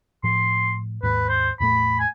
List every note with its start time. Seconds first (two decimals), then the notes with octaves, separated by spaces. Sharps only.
0.24 A2 F3 C6
1.03 D#2 G#2 B4
1.29 C5
1.60 E2 A2 A3 B5
2.00 G#5